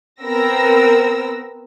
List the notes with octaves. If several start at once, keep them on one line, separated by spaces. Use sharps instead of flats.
B3 C4 A#4 E6 A#6